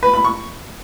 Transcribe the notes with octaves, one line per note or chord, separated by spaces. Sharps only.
B4
B5
C#6